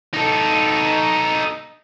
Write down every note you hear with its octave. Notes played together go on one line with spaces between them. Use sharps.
D#4 A4